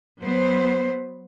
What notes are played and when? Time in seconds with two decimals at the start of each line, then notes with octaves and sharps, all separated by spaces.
0.21 F#3 B3 C5